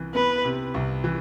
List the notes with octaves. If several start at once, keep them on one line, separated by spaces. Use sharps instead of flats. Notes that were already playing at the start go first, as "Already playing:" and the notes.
Already playing: C2 E3
B3 B4
C3
C2
E3